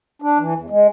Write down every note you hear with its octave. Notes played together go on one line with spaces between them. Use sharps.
D4
E3
E2
G#3